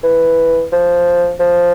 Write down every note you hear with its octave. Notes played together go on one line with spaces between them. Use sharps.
E3
F3
F3